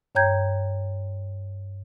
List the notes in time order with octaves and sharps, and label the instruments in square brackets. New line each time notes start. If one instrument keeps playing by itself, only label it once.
[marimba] G2 C#5 G5 A#5 G6 G#6